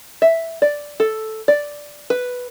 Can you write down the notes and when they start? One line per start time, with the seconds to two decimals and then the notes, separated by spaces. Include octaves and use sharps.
0.22 E5
0.62 D5
1.00 A4
1.48 D5
2.10 B4